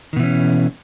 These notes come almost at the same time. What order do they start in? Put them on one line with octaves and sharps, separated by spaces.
D#3 B2 E3 C#4